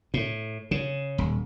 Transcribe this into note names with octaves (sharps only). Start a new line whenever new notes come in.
A2
C#3
D#1